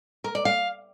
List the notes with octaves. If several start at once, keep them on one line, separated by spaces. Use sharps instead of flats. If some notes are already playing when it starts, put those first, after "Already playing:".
A#4
D5
F5